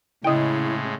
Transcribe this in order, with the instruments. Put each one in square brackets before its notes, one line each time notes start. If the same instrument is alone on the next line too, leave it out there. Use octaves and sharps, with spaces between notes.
[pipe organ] A2 G#3 [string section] C#3 [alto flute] E4 [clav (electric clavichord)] D#5 G5